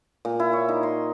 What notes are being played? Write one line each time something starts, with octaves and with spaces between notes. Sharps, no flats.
A#2
E4
C#5
D#4
C6